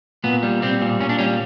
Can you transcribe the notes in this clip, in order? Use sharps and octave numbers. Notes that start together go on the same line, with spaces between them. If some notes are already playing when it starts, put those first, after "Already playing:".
A#2 B3
G3
G3 C4
A#2
A#2 C#4
D4
G3 C#4